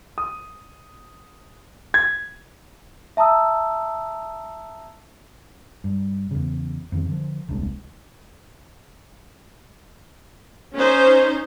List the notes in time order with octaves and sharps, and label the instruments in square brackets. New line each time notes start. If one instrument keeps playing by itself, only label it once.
[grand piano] D#6
G#6
[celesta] E5 A5 A#5 D#6 E6
[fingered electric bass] G2
E2 C#3
F2 D#3
D3 F3
D#1 C2 G#3 D4
[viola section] C#4 D#4 C5